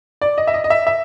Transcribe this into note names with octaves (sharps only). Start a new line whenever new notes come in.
D5
D#5
E5
D#5
D#5
E5
E5